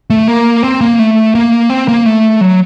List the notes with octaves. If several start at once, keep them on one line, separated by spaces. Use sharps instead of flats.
A3
A#3
C4
A#3
A3
A#3
C4
A#3
A3
F#3